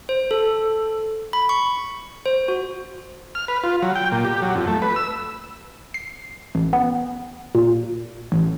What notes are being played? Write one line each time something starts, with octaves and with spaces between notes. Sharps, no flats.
C5
A4
B5
C#6
C5
F#4
F6
B4
F4
F#3
G5
A#2
G4
F#3
F2
A3
B4
E6
C7
A1
B3
A#2
A1